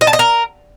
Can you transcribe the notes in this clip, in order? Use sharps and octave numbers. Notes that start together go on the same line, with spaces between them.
D#5
A5
D#5
A#4